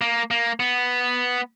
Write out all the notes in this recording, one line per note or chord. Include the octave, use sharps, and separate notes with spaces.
A#3
A#3
B3